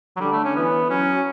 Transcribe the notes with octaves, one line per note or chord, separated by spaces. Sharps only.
F#3
D3 G3
A3
C#4
E3 B3
F#3 C#4